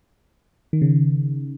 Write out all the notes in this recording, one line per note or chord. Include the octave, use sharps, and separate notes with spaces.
D#3
C#3